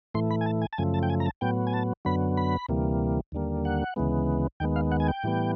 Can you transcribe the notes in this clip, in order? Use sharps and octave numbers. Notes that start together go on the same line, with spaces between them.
A2 E3 A3 C6
B5
G#5
A5
G#5
A5
F#2 C#3 F3 A3 G#5
A5
G5
G#5
A#5
A5
A2 F#3 B3 G5
G#5
A5
F#2 D3 F#3 B3 B5
B5
D2 C3 E3 G3 A#3
D#2 D3 G3 A#3
F#5
D2 C#3 E3 G#3 B3
D#2 D#3 G#3 B3 G5
F5
F#5
G#5
G5
A2 E3 G3 B3